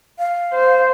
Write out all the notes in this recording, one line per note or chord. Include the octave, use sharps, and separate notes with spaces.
F5
C5